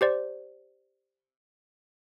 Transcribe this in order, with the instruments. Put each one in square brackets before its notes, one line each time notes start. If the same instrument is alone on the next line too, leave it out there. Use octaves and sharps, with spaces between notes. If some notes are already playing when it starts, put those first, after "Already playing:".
[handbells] G4 C5 D5